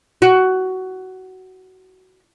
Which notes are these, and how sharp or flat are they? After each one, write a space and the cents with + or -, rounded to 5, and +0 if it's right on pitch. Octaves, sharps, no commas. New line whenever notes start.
F#4 +15